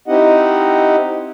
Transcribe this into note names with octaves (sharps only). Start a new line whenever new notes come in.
C4 D#4 E4 G4 D#5 F#5